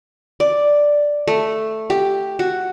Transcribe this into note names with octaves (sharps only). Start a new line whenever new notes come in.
D5
A3
G4
F#4